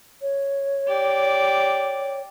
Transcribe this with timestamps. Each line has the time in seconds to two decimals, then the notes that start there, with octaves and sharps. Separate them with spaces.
0.21 C#5
0.88 G4 D5